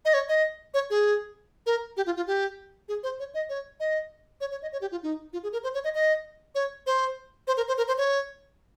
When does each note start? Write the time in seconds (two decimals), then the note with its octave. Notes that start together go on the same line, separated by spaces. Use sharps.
0.05 D#5
0.14 C#5
0.29 D#5
0.74 C#5
0.90 G#4
1.66 A#4
1.97 G4
2.06 F4
2.17 F4
2.27 G4
2.88 G#4
3.03 C5
3.20 C#5
3.34 D#5
3.49 C#5
3.80 D#5
4.41 C#5
4.52 C#5
4.62 D#5
4.72 C#5
4.81 G4
4.92 F4
5.03 D#4
5.33 F4
5.43 G#4
5.53 A#4
5.64 C5
5.74 C#5
5.84 D#5
5.94 D#5
6.55 C#5
6.87 C5
7.47 C5
7.57 A#4
7.68 C5
7.78 A#4
7.88 C5
7.98 C#5